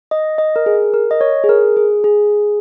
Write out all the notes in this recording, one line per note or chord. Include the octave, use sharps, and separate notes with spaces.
D#5
D#5
A#4
G#4
A#4
D#5
C#5
G#4
A#4
G#4
G#4